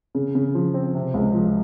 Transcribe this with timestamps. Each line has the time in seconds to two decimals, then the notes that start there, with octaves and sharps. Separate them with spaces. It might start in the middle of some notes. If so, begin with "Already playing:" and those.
0.15 C#3
0.35 C#3
0.55 F3
0.74 C4
0.95 C3
1.14 C#2
1.34 F3